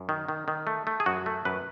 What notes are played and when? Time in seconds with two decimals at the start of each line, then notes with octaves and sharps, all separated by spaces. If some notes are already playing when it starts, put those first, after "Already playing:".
Already playing: F#2
0.09 D#3
0.29 D#3
0.48 D#3
0.67 A3
0.87 A3
1.00 G#4
1.06 F#2 F#4
1.26 A3
1.45 F#2 B4